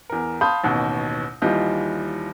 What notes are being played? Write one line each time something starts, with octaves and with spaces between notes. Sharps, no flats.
E2 A#4
F5 A5 B5 C6 D#6 G6
A1 D#2 B2
D#2 E3 G3 F4 D#5 G6